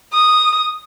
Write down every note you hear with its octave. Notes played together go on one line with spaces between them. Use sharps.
D#6